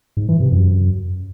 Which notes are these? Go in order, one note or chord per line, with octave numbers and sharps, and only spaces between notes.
G#2
E3
C3
F#2